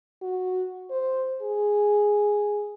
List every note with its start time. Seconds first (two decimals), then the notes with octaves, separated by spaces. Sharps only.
0.22 F#4
0.90 C5
1.42 G#4